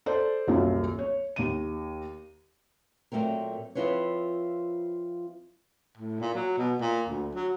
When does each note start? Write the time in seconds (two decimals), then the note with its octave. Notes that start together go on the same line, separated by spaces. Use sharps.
0.06 A4 C5 D5
0.47 D#1 C2 F#2 A#2 A#3 F4
0.99 C#5
1.36 D#2 D#7
3.12 A#2 F#3 A3 C4 A#4
3.75 F3 C4 E4 F4 B4 C#5
5.98 A2
6.21 A#2
6.34 F#3
6.57 B2
6.81 A#2
7.08 D2
7.35 F#3